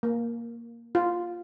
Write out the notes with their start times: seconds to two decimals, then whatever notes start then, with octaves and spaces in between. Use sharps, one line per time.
0.03 A#3
0.95 F4